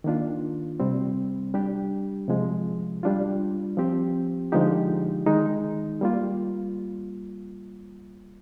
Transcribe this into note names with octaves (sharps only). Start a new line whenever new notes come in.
D#3 A#3 D4 F4
C3 G3 C4
G3 D4 G4
C3 F3 G#3
G3 D4 F4
F3 C4 G4
D3 F3 G#3 D#4 G4
D#3 G#3 D#4
G3 A#3 F4